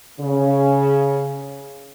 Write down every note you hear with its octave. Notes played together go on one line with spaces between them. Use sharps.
C#3